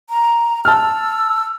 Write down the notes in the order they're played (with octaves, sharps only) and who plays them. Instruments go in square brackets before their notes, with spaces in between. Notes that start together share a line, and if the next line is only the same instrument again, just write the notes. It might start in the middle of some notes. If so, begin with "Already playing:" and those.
[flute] A#5
[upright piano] A5 F6 [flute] E6